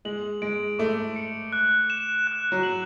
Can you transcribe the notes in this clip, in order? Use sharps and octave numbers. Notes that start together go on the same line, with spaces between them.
G#3 F#7
G#3 D7
A3 D6
C#7
F#6
E7
F#6
F#3
F#7